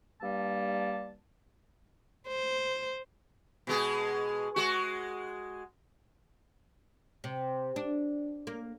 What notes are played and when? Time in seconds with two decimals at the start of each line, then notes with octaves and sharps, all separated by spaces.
0.21 G2 G3 A#3 A5
2.27 C5
3.67 B2 G#3 G#4
4.56 G#3 F#4
7.24 C3
7.76 D4
8.47 A#3